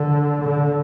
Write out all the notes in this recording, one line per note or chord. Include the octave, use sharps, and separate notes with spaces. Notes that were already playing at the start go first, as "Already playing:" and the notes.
Already playing: D3
D3